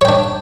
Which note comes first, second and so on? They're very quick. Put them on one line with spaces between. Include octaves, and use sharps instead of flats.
C#5 G5 D4